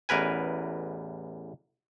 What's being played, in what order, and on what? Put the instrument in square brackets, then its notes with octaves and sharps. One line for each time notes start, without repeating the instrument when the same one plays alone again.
[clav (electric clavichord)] A1 E2 A#4 B4 G#5